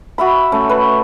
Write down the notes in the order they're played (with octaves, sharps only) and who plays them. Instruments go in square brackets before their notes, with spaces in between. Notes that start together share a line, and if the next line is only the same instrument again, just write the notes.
[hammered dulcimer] F#4 E5 B5
A3 C#4
B4